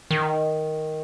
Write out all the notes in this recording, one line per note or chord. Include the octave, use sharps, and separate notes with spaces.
D#3